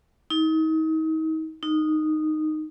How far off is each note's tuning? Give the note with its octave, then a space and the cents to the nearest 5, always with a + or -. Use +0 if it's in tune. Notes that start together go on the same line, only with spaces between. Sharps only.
D#4 +35
D#4 -10